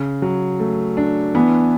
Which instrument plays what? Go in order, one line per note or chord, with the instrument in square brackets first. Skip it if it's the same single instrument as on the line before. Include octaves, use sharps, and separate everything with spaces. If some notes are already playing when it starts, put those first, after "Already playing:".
Already playing: [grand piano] C#3
F#3
A3
D4
[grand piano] E3 [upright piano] B3